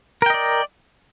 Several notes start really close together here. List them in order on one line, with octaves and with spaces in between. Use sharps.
A#4 G5 D#5 D5